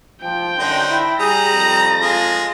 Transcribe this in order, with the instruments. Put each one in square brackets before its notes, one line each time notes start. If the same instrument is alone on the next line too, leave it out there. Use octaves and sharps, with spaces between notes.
[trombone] F3 [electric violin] G5
[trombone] F#2 [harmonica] D3 D#4 C5
[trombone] E4
[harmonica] G3 A#5 D#6 [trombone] G#4 [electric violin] A#6
[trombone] F2
[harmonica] G#3 F4